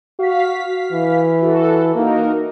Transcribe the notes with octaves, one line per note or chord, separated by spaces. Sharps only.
F#4 F5 B6
E3
F#4 A4
A#3 D#4 F#4 A#4